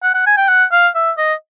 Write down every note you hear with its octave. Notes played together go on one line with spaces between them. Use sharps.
F#5
F#5
G#5
G5
F#5
F5
E5
D#5